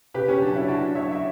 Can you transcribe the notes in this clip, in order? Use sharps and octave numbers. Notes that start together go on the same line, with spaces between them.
C#3 G4 B4
C#4
F#3 D4
C#4 E4
C#3 D4 F#4
F#3 C#5 E5
E5